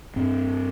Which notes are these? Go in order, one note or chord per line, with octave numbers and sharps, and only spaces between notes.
G2 C4